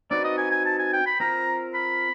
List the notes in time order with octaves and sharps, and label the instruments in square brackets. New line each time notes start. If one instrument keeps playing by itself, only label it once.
[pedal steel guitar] C4 D#4 F#4 B4 [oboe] D5
[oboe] D#5
G#5
G#5
A5
G#5
G5
B5
[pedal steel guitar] C4 F4 A#4 [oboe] A#5
[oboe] B5